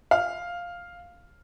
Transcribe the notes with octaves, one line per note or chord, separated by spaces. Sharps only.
F5